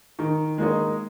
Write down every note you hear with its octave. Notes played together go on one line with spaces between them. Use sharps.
D#3
D#3 G#3 A#3 D#4